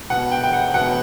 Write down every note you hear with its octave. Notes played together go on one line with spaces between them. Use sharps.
B2 F#5
G5
G5
F#5
B2 F#5